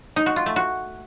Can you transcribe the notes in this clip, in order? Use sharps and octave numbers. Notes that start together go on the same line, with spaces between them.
D#4
F#4
F4
A3
F#4